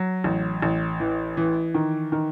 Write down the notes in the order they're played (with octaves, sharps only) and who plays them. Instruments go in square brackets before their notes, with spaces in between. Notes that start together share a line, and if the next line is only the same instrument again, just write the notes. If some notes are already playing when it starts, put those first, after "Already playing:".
Already playing: [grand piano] F#3
A1
A1
E3
E3
D#3
D#3